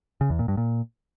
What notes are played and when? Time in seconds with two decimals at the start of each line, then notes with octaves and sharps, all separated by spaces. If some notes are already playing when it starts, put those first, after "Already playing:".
0.21 C#3
0.30 E2
0.39 A#2
0.48 G2
0.57 A#2